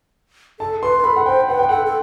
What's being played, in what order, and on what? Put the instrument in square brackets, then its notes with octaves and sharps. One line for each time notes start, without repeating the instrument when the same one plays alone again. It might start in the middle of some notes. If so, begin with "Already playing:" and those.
[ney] A4 [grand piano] A5
[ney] B4 [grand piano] C6
[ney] B4
[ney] A4 [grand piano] B5
[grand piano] F#5
[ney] C5 [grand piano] G5
[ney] B4 [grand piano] F#5
[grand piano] G5
[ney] A4 [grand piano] F#5
[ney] A4